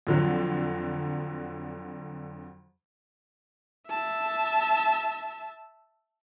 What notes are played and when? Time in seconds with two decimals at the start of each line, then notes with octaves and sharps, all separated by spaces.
0.07 F2 D3 F#3
3.90 E5 A5